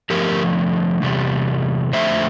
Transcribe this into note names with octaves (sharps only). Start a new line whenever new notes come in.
F2 D3 F3 A3 G4 A#4
E2 C3 G3
F2 D3 A3 C5 E5